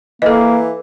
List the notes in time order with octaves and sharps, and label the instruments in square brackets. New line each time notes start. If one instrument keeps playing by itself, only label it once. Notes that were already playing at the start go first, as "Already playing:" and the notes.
[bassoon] E3 [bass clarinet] A#3 [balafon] A4 D#5